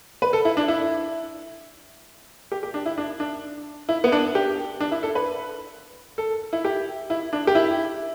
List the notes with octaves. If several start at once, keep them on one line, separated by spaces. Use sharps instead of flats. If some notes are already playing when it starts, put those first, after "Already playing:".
B4
A4
E4
D4
E4
G4
G4
D4
E4
D4
D4
E4
B3
D4
G4
D4
E4
A4
B4
A4
E4
G4
E4
D4
G4
E4